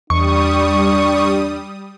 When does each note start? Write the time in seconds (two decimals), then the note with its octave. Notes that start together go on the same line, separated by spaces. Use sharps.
0.10 E2 G3 D4 C#6 D#6